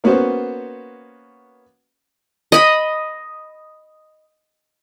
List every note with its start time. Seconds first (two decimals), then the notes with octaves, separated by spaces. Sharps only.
0.04 A#3 B3 C#4 F#4 C5
2.52 D#5 B5